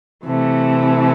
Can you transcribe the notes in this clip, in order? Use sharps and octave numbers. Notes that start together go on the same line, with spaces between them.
C3 E3 A3